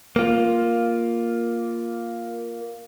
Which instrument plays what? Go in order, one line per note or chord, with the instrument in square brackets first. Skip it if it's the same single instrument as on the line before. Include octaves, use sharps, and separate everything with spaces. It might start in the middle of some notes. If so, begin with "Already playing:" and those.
[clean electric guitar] A#3 F4